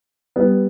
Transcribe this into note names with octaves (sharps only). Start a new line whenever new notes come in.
G3 B3